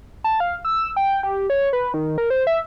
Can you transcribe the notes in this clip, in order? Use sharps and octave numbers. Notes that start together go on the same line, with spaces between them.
A5
F5
E6
G5
G4
C#5
B4
D#3
A#4
C5
E5